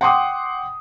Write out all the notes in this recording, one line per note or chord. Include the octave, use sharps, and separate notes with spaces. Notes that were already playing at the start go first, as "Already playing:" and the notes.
F#5 G5 C6 D6 D#6